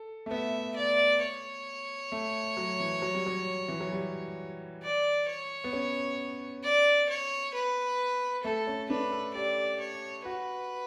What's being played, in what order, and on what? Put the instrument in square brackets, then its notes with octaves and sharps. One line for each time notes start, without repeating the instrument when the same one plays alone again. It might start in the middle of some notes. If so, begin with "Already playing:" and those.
Already playing: [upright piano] A4
A3
[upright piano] B3 [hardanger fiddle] E5
[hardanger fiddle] D5
C#5
[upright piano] A3
F#3
E3
F#3
G3
F#3
E3
F#3
G3
[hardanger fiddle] D5
C#5
[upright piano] B3
C#4
[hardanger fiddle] D5
C#5
B4
[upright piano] A3 [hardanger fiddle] A4
[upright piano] C#4
[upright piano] D4 [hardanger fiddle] B4
[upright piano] A4
[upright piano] G4 [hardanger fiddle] D5
[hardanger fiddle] C#5
[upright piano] F#4 [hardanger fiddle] B4